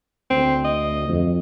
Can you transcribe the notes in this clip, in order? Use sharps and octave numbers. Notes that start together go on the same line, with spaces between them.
D2 C4
D#5
F2